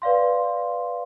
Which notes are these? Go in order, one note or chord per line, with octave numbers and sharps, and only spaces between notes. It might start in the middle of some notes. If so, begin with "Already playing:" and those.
B4 D5 F5 C6